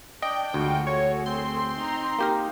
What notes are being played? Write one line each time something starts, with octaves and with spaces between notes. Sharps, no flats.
D4 D5 D#5 G5
D2 G#3 F4 F#4
A3 F#4 G#4 C#5
C4 C6
D#4 A#5
A#3 D#4 G4 A#4